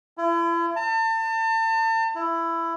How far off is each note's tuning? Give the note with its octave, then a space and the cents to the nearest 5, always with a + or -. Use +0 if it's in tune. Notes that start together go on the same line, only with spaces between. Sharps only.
E4 +40
A5 +35
E4 +15